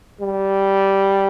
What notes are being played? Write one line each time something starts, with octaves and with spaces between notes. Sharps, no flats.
G3